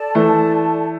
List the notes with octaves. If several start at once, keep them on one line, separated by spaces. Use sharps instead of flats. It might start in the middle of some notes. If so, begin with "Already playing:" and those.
Already playing: A4 D5 A5
E3 A3